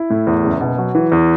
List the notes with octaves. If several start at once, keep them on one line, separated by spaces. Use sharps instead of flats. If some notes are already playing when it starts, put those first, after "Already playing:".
Already playing: E4
A2
E2
F#1
B2
F#3
E3
E2